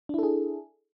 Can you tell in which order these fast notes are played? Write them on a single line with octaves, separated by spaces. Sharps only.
D4 E4 A4 G#4